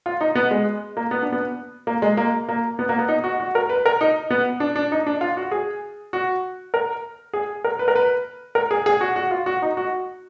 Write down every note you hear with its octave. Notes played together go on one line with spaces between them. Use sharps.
F4
D#4
B3
G#3
A#3
B3
D4
B3
A#3
G#3
A#3
A#3
B3
A#3
B3
D#4
F#4
F#4
A#4
B4
A#4
D#4
B3
D4
D4
D#4
D4
F4
F#4
G#4
F#4
A#4
G#4
A#4
B4
A#4
B4
A#4
G#4
G#4
F#4
F#4
F4
F#4
D#4
F#4